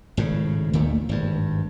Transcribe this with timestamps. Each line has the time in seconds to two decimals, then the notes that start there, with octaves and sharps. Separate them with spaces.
0.17 G#1 A2 C#3
0.73 D2 A#2 D#3 A3
1.09 G#1 G2